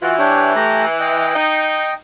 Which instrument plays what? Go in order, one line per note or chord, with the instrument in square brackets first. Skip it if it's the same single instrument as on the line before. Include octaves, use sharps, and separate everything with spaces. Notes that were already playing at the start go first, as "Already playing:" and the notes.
[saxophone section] E3 [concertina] F4 F#4
[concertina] D4 G4 C#5
A3 G4 A#5
D#5 G5
[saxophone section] D#4